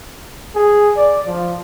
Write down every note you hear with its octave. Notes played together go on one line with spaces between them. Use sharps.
G#4
D5
F3